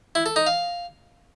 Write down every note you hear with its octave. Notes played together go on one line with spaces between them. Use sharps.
E4
A4
D#4
F5